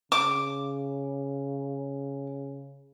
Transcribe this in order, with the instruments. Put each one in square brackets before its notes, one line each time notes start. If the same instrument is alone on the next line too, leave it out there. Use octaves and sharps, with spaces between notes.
[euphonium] C#3 [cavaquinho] D6